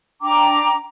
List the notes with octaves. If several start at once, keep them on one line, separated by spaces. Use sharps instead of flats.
D4 G5 A#5 D6